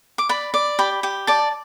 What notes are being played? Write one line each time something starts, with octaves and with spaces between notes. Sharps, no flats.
D6
D5 B5
D5
G4 B5
G4
D5 A5